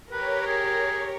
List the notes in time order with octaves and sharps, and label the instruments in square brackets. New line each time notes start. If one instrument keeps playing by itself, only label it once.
[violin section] G4 A#4 [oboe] B4 [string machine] C#5
[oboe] G#4